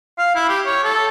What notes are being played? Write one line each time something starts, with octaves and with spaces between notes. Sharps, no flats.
F5
E4
G4
C#5
A4